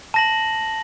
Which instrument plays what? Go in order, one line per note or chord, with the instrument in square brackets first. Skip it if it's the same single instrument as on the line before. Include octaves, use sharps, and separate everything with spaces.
[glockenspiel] A5 A#6 F#7